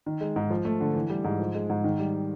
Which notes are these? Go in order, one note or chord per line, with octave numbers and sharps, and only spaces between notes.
D#3
G#3
G#2
F3
A3
D3
E3
G3
G#2
F3
G#3
G#2
D#3
G3